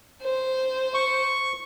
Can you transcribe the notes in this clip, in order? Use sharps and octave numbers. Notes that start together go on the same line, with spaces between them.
C5
C#6